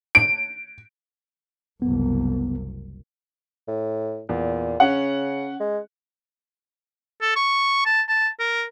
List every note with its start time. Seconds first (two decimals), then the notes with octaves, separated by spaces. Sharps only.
0.15 D7
1.82 F#1 C2 B3
3.68 A2
4.29 E2 A#2
4.80 C#3 C#4 F#5
5.60 G#3
7.21 A4
7.36 C#6
7.85 A5
8.08 A5
8.39 A#4